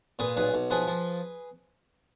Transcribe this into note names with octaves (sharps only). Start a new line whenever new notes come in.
A#2 G#4 B4
B1 G#4 B4
B1
F3 G#4 B4
F3